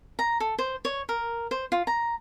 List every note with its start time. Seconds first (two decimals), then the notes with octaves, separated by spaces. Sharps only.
0.19 A#5
0.40 A4
0.59 C5
0.85 C#5
1.09 A#4
1.51 C5
1.72 F4
1.87 A#5